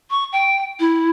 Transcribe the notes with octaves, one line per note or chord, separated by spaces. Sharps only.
C#6
G5
E4